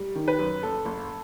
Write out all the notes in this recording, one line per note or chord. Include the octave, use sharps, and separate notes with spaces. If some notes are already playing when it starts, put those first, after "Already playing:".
Already playing: G3
D#3
B4
F#2
F#1 A4
F#1